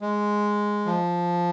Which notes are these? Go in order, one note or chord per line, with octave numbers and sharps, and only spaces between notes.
G#3
F3